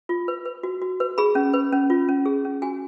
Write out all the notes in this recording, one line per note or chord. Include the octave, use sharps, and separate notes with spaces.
F4
B4
B4
F#4
F#4
B4
G#4 B5
C#4
B4
C#4
F4
C#4
G#4
C#4
F#4 G#5